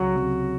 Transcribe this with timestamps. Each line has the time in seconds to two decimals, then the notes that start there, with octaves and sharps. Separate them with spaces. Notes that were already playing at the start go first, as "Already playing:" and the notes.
Already playing: C#2 F#3 F#4
0.14 C3 F#3